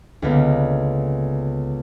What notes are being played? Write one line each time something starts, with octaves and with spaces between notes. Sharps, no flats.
C#2 D3 A#3 B3 B4